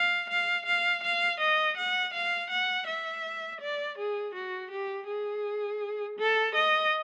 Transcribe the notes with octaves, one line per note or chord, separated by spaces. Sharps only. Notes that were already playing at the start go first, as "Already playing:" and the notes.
Already playing: F5
F5
F5
F5
D#5
F#5
F5
F#5
E5
D5
G#4
F#4
G4
G#4
A4
D#5